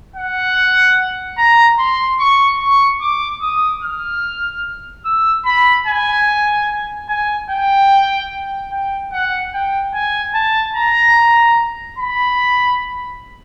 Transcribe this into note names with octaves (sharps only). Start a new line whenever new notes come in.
F#5
A#5
C6
C#6
C#6
D6
D#6
F6
E6
B5
G#5
G#5
G5
G5
F#5
G5
G#5
A5
A#5
B5